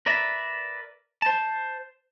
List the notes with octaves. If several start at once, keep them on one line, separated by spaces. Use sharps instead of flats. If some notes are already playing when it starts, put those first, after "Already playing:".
A#4 B4 D5 E5
C5 A5